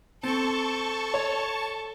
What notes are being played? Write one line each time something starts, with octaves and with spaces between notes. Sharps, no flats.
C4 A4 A5 C#6
C#5